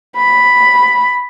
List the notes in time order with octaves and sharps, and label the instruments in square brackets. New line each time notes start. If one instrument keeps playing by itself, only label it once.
[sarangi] B5